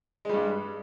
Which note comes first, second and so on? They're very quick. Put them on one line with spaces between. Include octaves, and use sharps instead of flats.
G#3 G3 G2